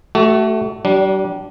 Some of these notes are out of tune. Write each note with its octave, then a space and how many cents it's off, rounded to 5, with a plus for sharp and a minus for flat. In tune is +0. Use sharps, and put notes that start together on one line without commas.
A3 +0 F#4 +35 A4 -10
G3 -40 D4 -10